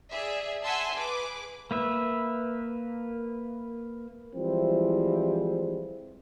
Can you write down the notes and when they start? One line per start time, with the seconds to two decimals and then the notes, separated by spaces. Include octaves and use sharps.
0.11 G#4 D5 E5
0.64 E5 F#5 G#5 A5 C6 E6
0.95 G#4 B4 D6
1.71 A#3 B4 E5
4.36 E3 F3 G3 G#3 C4 E4